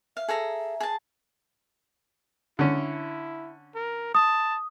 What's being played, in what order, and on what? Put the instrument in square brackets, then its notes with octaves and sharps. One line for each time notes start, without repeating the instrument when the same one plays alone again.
[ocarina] E5 [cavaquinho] F5
[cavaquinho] G#4 A4 A#5
G#4 A5
[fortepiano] D3 C#4 [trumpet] E4
[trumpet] A#4
[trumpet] A5 [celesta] D#6